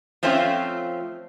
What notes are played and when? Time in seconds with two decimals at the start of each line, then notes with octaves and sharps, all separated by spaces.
0.23 F3 A3 C4 C#4 F4